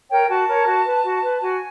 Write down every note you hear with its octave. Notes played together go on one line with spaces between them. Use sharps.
A#4 C#5 G5
F#4 A5
A#4 C#5
F#4
B4
F#4
B4
F#4 G#5